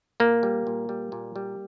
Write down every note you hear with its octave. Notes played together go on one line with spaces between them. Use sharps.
A#2 A#3
G3
A#2
G3
A#2
G3